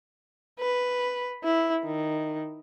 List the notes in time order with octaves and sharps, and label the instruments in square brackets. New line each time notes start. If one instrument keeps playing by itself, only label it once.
[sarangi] B4
E4
D#3